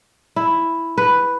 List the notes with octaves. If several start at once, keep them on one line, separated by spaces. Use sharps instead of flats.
E4
B4